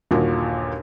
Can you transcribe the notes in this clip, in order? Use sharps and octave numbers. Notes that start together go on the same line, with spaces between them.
G1 D#2 A#2 F#4